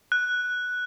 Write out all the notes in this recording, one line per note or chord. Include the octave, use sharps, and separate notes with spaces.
F#6